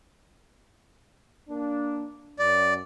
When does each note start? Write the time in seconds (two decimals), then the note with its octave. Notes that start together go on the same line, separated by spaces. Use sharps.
1.50 A#3 D4
2.39 F#2 D5